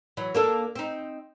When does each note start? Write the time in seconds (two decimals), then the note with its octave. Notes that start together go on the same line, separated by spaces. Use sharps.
0.17 E3 F#3
0.35 A#3 D4 A4
0.76 C4 D#4